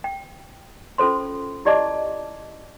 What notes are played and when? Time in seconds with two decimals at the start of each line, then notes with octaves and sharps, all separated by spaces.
0.04 G5
0.98 C#4 F4 A4 C5 C6
1.65 E4 G4 D5 D#5 A5 D6